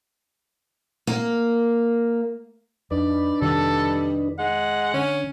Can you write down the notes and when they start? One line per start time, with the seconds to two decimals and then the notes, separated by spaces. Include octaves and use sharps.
1.07 A#3
2.91 F2 D4 D#4 B4 D5
3.41 F2 C3 D#3 G3 A4
4.39 G#3 F#5
4.94 D3 C#4